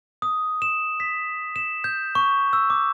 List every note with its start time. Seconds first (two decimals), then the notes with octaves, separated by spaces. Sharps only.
0.22 D#6
0.62 E7
1.00 B6
1.56 E7
1.84 G6
2.15 C#6
2.53 E6
2.70 D6